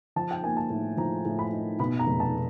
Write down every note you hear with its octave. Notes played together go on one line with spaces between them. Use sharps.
F3 A5
G5
A#3 G#5
A5
A2
F3 A#5
A2
B5
D#4
B2 B5
A#5
F1
A5